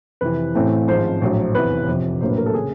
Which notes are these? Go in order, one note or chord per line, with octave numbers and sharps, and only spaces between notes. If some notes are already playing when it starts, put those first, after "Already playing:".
F2 C3 E3 B4
A1 A2 E3 A3 C4
G#1 G#2 F3 C5
A#1 A2 F#3
F1 E2 C3 E3 B4
F2 C3 F3
A#1 A2 F#3 A#3 C5
B4
A#4
A4
C#3 G#4